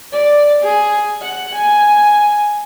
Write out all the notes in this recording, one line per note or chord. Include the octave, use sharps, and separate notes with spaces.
D5
G#4
F#5
G#5